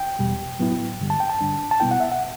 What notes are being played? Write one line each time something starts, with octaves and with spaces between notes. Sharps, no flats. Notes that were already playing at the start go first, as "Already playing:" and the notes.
Already playing: G5
E2 B2 G3
A2 F#3 B3 E4
G2 D3 G3
A5
G5
A5
G2 D3 G3 D4
A5
B2 G3 B3 E4 G5
F#5
E5
F#5